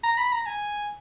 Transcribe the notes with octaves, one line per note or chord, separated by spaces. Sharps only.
A#5
B5
A#5
G#5